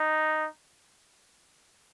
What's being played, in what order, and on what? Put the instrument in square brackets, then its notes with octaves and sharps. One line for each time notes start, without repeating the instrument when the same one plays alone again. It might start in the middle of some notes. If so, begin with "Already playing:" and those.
Already playing: [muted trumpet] D#4